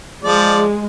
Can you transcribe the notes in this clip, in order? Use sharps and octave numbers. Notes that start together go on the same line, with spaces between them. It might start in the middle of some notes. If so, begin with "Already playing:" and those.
F3 G#3 D5